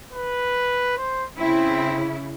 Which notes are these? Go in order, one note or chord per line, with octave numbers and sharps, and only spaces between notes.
B4
C5
C#3 C4 E4